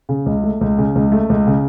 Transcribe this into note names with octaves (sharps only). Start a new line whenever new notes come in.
C#3
C#2
A3
C#2
C#3
C#2
A3
C#2
C#3